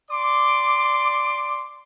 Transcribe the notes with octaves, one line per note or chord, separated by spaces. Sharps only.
D5 C6 D6